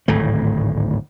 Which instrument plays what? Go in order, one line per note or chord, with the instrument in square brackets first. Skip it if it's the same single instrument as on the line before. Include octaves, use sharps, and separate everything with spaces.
[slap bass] D1 G#1 A2 A3